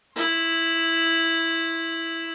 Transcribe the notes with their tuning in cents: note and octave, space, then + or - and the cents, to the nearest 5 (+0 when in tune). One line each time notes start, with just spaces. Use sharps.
E4 +0 C6 +30